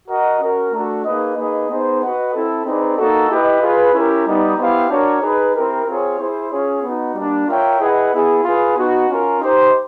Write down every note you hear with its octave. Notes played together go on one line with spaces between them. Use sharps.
F#4 A#4 D#5 F#5
C#4 F#4 A#4
A3 D4 F#4 A4
A#3 D#4 G#4 B4 D#5
A#3 D#4 G#4 B4 D#5
B3 D#4 G#4 C5
F#4 B4 D#5 F#5
C4 E4 A4
C4 D#4 G#4 B4 D5
A#3 D#4 F#4 A4
E4 G4 B4 D#5
F4 G#4 B4
C#4 E4 G4 A#4
G3 B3 D#4
B3 E4 G4 C5 F5
D4 F#4 A#4 C#5
D#4 G#4 B4
C4 E4 G4 A#4
C4 F4 G#4 C#5
E4 G#4 C5
C#4 F4 G#4 C#5
B3 D#4 F#4
G3 A#3 D4
F4 A#4 C#5 E5 G5
E4 G#4 B4 D#5 F#5
B3 E4 G#4
F4 G#4 B4
B3 D#4 F#4
C#4 F4 A#4
D#4 G4 C5